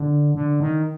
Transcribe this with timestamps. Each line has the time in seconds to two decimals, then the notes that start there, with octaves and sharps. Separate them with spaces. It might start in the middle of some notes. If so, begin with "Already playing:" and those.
Already playing: D3
0.35 D3
0.60 D#3